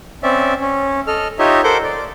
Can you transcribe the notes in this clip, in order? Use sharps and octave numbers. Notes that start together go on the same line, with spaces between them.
C4 C#4 D5 E5
C#4
A4 D#5 F6
D#4 F4 G4 C#5 D#5 E5
A4 A#4 C5 F#5 D6 G6
D5